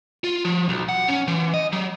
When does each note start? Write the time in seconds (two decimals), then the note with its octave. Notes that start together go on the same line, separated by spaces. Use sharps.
0.24 F4
0.45 F3
0.69 B1
0.89 F#5
1.08 C#4
1.28 E3
1.54 D#5
1.73 F#3